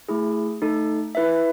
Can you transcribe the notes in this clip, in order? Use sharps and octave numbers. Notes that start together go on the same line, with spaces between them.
A3 E4 G#4
A3 D#4 A4
E4 B4 E5